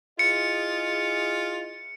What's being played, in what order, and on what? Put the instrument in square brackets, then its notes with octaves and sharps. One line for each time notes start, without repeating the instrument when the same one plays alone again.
[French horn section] E4 G#4 D#5 [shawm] F4 [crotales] C#7